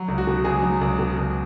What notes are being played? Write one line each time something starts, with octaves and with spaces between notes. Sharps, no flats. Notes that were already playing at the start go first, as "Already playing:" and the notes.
Already playing: F#3
C#2
F#4
B2
C#2 G#4
F#3
C#2
B2
C#2